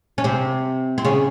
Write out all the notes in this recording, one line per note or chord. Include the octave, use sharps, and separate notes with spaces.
C#4
C3 C4
C4
C#3 C#4